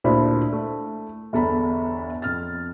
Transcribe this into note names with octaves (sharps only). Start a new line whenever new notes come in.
D2 A#2 D4 E4 C5 B5
A3
G1 E2 A4 A#5 B5
F2 F6 A6